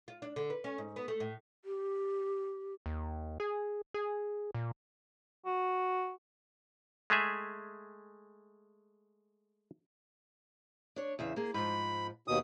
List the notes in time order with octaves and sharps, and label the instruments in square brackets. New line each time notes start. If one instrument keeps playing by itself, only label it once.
[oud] F4
D4
D3
B4
C#4
G#2
B3
A3
A2
[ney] G4
[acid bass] D#2
G#4
G#4
A#2
[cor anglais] F#4
[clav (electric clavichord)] G#3 A3 G#4 E5
[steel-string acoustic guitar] D4 C#5
E2 C#3 E5
A#3 G#4
[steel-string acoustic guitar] G#2 F3 [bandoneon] B5
[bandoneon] D#2 B2 D#6